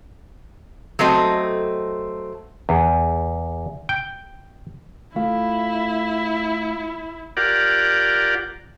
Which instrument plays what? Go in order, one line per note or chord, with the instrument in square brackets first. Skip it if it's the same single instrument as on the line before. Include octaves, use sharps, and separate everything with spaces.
[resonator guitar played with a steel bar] F#3 A3 C4 D#5
[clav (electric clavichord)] E2
G5
[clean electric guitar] A3 [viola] E4 [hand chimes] F4 F5
[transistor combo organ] F4 G4 A#4 D5 F#5